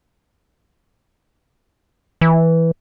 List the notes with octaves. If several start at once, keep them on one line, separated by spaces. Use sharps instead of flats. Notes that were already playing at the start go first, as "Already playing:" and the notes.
E3